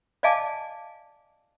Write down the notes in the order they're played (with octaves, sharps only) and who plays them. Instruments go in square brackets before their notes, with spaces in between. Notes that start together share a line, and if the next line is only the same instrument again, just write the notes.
[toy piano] D5 D#5 F5 G#5 A5 D6